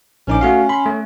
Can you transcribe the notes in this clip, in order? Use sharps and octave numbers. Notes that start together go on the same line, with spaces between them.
A#1 C#4 D#4 D6
A3 F#4 F5
B5 C6
A3